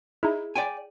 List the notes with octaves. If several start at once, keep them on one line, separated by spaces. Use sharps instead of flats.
D#4 E4 G#4
D5 G5 G#5